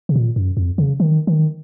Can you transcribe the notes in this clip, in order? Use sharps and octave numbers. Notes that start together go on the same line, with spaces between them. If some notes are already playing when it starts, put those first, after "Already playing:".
C3
A#2
F#2
F2
C#3
D#3
D#3